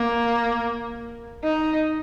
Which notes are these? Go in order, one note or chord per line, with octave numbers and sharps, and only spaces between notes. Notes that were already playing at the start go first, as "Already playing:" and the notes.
Already playing: A#3
D#4